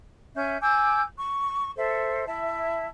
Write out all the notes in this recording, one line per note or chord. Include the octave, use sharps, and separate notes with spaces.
C#4 E5 G6
G#5 D6 E6 G6
C#6
A4 C5 E5
E4 E5 A5